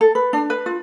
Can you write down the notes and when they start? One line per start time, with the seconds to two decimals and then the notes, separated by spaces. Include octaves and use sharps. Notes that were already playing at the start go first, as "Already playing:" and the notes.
0.01 A4
0.15 B4
0.33 D4
0.50 B4
0.66 F4